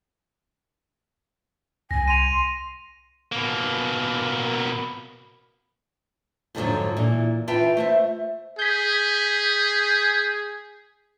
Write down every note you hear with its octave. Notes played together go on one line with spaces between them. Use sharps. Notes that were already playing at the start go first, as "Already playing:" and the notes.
C2 G#5 A#6
C6 D#7 F7
B2 A#3
F2 G#2 D3 D#3 F3 F#3
A#2 E3
E3 F4 B4 E5 G5 A5
A3 C5 E5
G#4 G6 B6